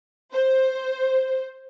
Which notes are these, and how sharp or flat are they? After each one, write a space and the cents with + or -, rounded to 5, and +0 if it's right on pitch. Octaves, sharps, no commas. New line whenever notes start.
C5 +5